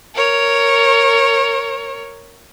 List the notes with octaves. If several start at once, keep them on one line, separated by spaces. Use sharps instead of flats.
A#4 C#5